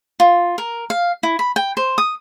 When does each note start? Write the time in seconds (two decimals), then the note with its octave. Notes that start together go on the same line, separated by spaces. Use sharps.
0.20 F4
0.58 A#4
0.90 F5
1.23 E4
1.39 B5
1.56 G5
1.77 C5
1.98 D#6